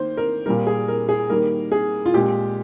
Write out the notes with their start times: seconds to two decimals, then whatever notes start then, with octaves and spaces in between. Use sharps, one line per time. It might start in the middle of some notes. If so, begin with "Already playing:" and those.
Already playing: D#3 A#3 C5
0.17 A#4
0.46 A#2 G3 A#3 A#4
0.67 G#4
0.88 A#4
1.09 G#4
1.30 D#3 G3 A#3 A#4
1.72 G#4
2.06 F4
2.14 A#2 G#3 G4